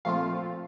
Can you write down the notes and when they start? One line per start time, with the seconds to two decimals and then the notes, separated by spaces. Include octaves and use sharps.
0.05 A#2 F3 A3 C4 F4 F5